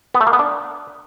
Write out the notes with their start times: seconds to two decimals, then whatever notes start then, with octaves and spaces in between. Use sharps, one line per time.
0.14 B3
0.21 A3
0.27 A#3
0.33 B3
0.39 D4